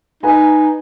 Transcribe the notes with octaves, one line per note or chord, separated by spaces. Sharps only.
D#4 B4 G#5 A#5